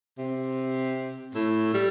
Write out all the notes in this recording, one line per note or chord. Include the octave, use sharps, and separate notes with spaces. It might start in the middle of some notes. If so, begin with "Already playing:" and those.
C3
A2
G3